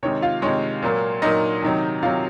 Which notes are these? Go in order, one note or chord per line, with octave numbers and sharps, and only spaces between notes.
C3 D#3 G#3 C#5
F4 F5
C3 D#3 G#3 C#5
A#2 F#3 A#3
A#2 F#3 A#3 D#4 D#5
C3 D#3 F#3
C3 D#3 F#3 F4 F5